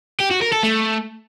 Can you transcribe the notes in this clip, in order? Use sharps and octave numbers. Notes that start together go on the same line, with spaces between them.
G4
F#4
A#4
A4
A3